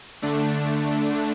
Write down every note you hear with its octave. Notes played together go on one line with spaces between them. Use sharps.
D3 A3 D4